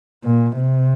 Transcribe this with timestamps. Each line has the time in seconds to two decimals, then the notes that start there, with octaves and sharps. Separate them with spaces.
0.25 A#2
0.57 C3